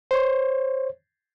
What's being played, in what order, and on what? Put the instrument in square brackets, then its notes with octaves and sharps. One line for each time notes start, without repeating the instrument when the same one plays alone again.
[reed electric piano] C5 C#5